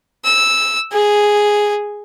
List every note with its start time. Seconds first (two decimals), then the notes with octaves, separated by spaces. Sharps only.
0.25 E6
0.92 G#4